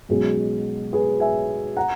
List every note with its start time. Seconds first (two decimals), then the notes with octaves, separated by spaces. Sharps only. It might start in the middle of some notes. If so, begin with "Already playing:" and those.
0.09 B1 B2 G#3 C#4 G#4
0.93 G#4 B4
1.20 E5 G#5
1.77 F#5 A#5